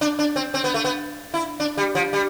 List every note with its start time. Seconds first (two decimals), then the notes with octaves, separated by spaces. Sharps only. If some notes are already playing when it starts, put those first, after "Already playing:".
0.01 D4
0.19 D4
0.36 C4
0.54 C4
0.64 B3
0.74 A3
0.85 B3
1.34 E4
1.60 D4
1.77 G3
1.95 F3
2.13 G3